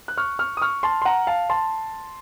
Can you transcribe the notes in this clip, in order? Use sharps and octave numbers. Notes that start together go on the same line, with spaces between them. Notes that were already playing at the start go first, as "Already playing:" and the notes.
F#6
C#6 F6
C#6 F6
D#6
C#6 F6
A5 C6
C6
F#5 A#5
F5 A5
A5 C6